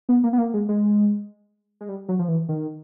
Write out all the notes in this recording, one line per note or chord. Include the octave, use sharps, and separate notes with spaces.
B3
A#3
B3
A#3
G#3
G#3
G#3
G3
F#3
F3
E3
D#3